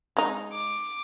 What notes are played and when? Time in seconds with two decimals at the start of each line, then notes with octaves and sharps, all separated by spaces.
0.17 G#3 D#4
0.52 D6